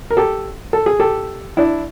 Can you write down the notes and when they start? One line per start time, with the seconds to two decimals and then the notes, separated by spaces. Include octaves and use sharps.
0.11 A#4
0.17 G4 A4
0.73 A4
0.86 G#4
1.00 G4 A4
1.57 D4 E4